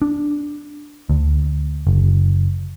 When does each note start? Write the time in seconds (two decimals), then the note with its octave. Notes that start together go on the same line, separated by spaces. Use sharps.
0.02 D4
1.09 D2
1.87 F#1